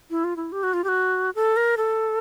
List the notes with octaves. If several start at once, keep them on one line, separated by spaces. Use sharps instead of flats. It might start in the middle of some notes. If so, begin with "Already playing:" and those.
E4
F4
E4
G4
F#4
F4
G4
F#4
A4
A#4
A4